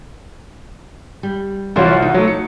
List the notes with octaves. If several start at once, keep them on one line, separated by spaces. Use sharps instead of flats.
G3
C2 E3 F4 F#4 C5 C#5
D#4
F#3 A3
C#7